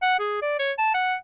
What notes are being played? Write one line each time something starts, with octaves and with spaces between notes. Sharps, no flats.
F#5
G#4
D5
C#5
A5
F#5